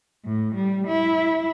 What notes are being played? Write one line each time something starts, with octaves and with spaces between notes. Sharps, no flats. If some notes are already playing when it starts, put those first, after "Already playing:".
A2
G3
E4